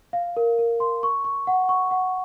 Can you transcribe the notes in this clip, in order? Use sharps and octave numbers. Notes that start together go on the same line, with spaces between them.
F5
A#4
A#4
C6
C#6
C#6
F#5
C#6
F#5